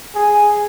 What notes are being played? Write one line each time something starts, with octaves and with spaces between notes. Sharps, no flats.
G#4